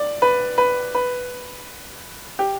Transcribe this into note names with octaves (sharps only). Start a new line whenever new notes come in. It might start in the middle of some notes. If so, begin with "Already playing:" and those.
Already playing: D5
B4
B4
B4
G4